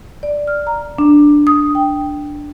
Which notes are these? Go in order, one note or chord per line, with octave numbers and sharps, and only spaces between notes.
D5
F6
A#5
D4
D#6
G5